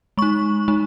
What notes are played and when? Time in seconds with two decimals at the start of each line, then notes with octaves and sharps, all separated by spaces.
0.17 G#3 D#4 C#6
0.68 G#3 D#4